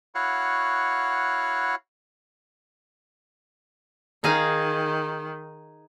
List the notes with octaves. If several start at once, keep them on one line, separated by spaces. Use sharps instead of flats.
E4 F#4 C#5 F5 F#5
D#3 D#4 G#4 F5